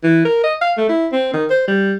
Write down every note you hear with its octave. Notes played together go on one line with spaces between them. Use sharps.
E3
A#4
D#5
F5
A3
E4
C4
D#3
C5
G3